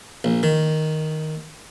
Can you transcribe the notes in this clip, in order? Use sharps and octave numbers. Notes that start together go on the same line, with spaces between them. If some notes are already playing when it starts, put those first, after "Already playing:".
A#1
D#3